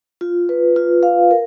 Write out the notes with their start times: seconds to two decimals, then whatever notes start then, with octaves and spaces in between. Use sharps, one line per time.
0.21 F4
0.49 B4
0.76 F4
1.03 F5
1.31 A#4